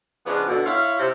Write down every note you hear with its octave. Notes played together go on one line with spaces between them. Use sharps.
C#3 F3 G#3 B3 D4
B2 D3
E4 F4 C#5 F5
C3